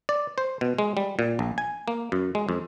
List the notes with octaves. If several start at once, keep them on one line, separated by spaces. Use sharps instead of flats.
D5
C5
B2
G#3
G3
A#2
A#1
G#5
A#3
F#2
G#3
F2